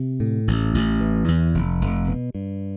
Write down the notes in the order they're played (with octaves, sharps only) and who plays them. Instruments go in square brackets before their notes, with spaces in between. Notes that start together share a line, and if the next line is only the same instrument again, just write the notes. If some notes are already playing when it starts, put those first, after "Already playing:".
Already playing: [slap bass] C3
A2
A1
A1
E3
E2
F1
F1
B2
G2